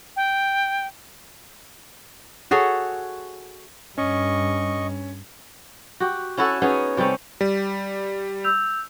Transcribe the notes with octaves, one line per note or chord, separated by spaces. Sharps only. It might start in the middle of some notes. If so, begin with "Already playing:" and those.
G5
F#4 G#4 A4 C#5
G2 C#4 D#5 C#6
F#4 G4
C#4 E4 F#4 A4
B3 C#4 D#4 G#4
C3 G3 A3 C#4
G3
E6 G6 F7